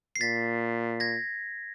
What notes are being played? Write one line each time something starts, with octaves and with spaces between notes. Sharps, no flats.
C7
A#2 A6 B6
G#6 A#6